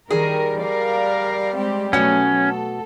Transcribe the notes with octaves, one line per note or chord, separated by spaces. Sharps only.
D#3 G3 G#4 A#4
A#4 D5 F5
G#3 C4 G4
B2 F#3 A3 C#4 F#5
A4